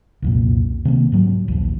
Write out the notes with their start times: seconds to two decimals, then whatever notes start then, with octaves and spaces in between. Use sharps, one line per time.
0.22 C2 F2 A#2
0.85 C3 D#3 G#3 A#3
1.12 G#2 F#3
1.48 A#1 D#2 F3